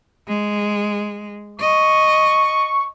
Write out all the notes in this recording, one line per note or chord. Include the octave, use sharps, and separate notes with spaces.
G#3
D#5 C#6